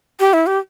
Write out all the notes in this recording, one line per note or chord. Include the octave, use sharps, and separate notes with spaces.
G4
E4
G4